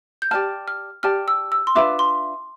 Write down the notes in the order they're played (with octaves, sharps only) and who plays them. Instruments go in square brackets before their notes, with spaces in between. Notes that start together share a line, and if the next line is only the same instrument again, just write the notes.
[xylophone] G6
[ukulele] G4 D5 A5 [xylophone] F6
[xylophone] F6
[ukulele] G4 D5 A5 [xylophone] F6
[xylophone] E6
E6
C6
[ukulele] D4 F4 B4 E5 [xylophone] D6
[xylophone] C6